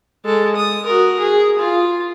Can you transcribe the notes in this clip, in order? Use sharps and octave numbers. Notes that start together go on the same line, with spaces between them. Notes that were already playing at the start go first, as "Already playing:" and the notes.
G#3 A4
D#6
F#4 A#4
G#4
F4